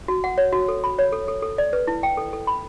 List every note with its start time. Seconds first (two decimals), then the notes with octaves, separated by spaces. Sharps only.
0.08 F#4
0.24 F#5
0.38 C#5
0.53 F#4
0.68 A4
0.84 B5
0.99 C#5
1.12 A4
1.28 A4
1.42 A4
1.58 D5
1.73 B4
1.87 E4
2.03 G5
2.17 A4
2.33 A4
2.47 B5